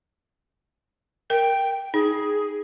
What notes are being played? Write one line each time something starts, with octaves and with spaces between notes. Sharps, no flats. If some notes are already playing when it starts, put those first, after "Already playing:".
A#4 G5
D#4 G#4